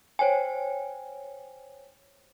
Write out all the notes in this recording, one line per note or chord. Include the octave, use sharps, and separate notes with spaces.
C5 C#5 G5 G#5